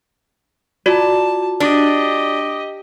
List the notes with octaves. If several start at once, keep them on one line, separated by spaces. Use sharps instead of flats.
F4 F#4 D5 A5
D4 G4 D#5